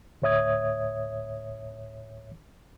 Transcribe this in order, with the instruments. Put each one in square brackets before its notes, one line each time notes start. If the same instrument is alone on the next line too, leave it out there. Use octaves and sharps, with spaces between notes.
[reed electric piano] D2 A2 C#5 E5 D#6 G#6